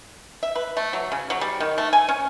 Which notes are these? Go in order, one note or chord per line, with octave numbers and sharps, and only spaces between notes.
E5
B4
A3
F#3
C#3
F#3
G3
D#3
A3
G#5
C#4